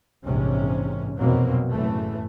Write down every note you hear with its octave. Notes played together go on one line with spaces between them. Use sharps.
A#1 E2 G#2 C3 C#4
F1 E2 B2 F#3 A#3 C4
F#1 A2 E3 A3